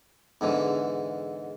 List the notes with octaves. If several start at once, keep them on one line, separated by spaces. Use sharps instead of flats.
E2 G#2 D3 E3